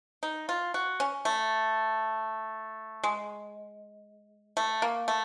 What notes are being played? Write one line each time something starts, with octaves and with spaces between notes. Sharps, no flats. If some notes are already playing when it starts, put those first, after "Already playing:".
D#4
F4
F#4
C#4
A3
G#3
A3
A#3
A3